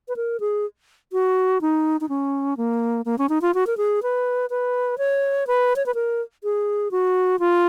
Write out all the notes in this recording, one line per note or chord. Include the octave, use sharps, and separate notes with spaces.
B4
A#4
G#4
F#4
D#4
D#4
C#4
A#3
A#3
C#4
D#4
F4
F#4
A#4
G#4
B4
B4
C#5
B4
C#5
B4
A#4
G#4
F#4
F4